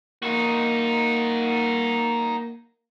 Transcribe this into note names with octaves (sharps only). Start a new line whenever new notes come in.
A#3 D#4 F#4